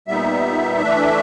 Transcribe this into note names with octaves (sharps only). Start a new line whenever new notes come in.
A#2 G3 B3 D#4 E5
E3 A3 D4